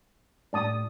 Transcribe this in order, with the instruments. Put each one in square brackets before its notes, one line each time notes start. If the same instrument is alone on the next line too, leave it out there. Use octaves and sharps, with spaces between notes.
[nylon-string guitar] A2 [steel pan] D5 A5 D#6